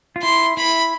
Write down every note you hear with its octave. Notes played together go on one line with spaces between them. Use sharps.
F4
E4 C6
E4 B5